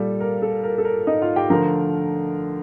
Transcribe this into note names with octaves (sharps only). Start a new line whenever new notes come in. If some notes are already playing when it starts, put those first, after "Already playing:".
Already playing: A#2 G3 A4
A#4
A4
A#4
A4
A#4
D#4 D#5
F4 F5
G4 G5
D3 F3 A3 A#4 A#5